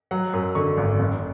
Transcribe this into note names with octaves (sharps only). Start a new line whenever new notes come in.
F#3 F#5
F#2
D3 C#6
G#1
F#1